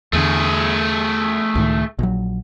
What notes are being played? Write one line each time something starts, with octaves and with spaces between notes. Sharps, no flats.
E2 D3 A3 G#4
C#2 A2 D#3
A#1 F#3